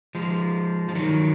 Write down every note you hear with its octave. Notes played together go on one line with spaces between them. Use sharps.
F3 G#3
F3
D#3 F#3